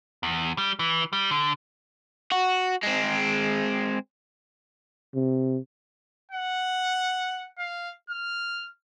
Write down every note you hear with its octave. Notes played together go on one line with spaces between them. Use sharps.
E2
G3
E3
G3
D3
F#4
G#3 C4
C3
F#5
F5
F6